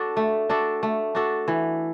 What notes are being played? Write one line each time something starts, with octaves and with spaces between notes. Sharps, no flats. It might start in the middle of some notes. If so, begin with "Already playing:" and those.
Already playing: D4 F#4 A4
A3
D4 F#4 A4
A3
D4 F#4 A4
E3